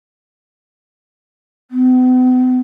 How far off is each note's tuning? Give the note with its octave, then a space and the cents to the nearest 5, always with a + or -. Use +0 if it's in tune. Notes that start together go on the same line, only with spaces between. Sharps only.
B3 +45